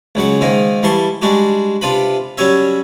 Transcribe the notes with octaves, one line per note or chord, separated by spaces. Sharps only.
C#2 C#3 F#3 F#5
G#2 D#3 A#3 D#4
E3 G3 A5 C6 C#6
G3 G#3 D4 F#4 G4
C3 D4 F4 B4 B5
F#3 G3 C#4 C#5 E5